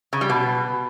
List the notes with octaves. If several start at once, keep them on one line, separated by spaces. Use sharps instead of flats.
C#3
G3
B2